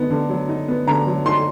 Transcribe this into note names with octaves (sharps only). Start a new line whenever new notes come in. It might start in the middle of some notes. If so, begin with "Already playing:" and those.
Already playing: D3 B3 D#4
D3
F#3
D#4
B3
D3 A#5
F#3
D#4 C6